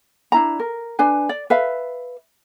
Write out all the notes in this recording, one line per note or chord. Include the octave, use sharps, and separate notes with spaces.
D4 E4 A#5
A#4
D4 B4 G#5
D5
B4 E5 F5